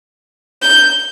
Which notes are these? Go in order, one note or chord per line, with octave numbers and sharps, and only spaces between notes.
G6